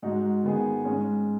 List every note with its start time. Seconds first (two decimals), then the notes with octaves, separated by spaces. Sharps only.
0.02 G#2 G#3 D#4 F#4
0.44 D#3 B3 G#4
0.85 G#2 G#3 C#4